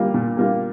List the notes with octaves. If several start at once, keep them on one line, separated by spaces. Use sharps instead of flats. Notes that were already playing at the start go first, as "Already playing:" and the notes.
Already playing: G3 A#3 F4
A#2
G3 A#3 F4